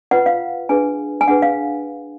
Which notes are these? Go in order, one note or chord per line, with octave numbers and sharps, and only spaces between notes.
F4 B4 F#5
F5
D4 G#4 B4 G#5
G#5
D4 G#4 B4 F#5
F5